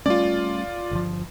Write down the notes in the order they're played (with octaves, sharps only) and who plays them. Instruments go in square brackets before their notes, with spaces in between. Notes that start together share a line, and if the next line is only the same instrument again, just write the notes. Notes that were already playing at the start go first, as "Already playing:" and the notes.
[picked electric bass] G3 A3 C#4 [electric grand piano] F4 D5
[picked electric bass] G1 F3